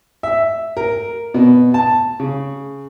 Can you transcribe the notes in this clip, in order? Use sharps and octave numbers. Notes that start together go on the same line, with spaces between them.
E5
A#4
B2
A5
C#3